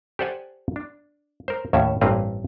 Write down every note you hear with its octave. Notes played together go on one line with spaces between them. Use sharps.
G4 A4 C5 D5 F#5 G#5
D4
A#4 C5
D#2 A2 C#4 E5
A1 G2 A#3 C4 B4